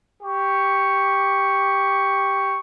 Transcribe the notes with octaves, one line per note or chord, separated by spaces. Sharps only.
G4 C#6